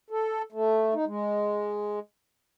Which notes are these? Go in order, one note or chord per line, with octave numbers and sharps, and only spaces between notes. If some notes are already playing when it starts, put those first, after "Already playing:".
A4
A3
D#4
G#3